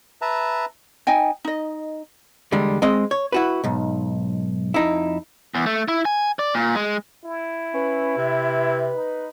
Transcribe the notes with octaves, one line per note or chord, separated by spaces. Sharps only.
B4 E5 A5 A#5
D#4 D#5 G5 G#5
D#4 D#5
E2 D3 G3 G#3
G#3 C4 D#5
C#5
E4 F#4 B4
B1 G#2
F2 D#4 E4
E2
A3
E4
G#5
D5
A#2
G#3
E4
C#4 B4
C3
D#4